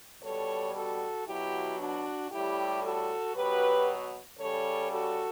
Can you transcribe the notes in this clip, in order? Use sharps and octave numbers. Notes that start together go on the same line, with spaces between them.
B2 G3 A4 C#5
F#4 A4
B2 F#3 E4 G4
D4 F#4
A2 G3 E4 G4
F#4 A4
B2 F#3 G4 B4
C#3 G3 A4 C#5
F#4 A4